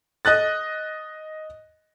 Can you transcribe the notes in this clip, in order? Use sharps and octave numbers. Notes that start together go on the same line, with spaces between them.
D#5 D#6 F#6 A6